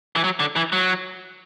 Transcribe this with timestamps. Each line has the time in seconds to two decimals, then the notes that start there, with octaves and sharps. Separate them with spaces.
0.16 E3
0.24 F#3
0.40 D3
0.56 E3
0.73 F#3